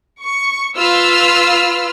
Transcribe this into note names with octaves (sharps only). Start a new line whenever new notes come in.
C#6
F4 B4 F5 E6 F6